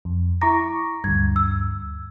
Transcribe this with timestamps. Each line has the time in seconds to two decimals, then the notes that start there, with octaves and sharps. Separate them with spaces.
0.05 F2
0.41 E4 A#5 C#6 D6 A#6
1.04 D2 G2 G#6
1.36 E6